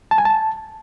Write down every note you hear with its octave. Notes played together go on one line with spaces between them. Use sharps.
A5
G#5
A5